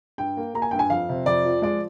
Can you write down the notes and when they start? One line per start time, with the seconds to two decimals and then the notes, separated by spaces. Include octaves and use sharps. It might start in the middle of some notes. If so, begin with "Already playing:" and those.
0.18 G2 G5
0.37 A#3
0.54 A#3 A#5
0.62 G#5
0.71 G2 G5
0.79 G#5
0.90 F2 F5
1.09 C3
1.26 F2 D5
1.45 F3
1.62 G#3 D5